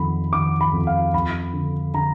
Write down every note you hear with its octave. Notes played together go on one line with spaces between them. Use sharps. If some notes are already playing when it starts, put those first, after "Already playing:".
Already playing: F2 D#3 B5
D#3 D6
B5
F2
F5
F2 B5
D3
D3 A#5